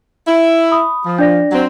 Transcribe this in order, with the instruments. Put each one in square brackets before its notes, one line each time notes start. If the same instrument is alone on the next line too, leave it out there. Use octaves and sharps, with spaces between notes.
[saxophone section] E4
[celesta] B5 D#6
[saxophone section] F3
[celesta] D4 D5 A#6
[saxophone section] F#3 C4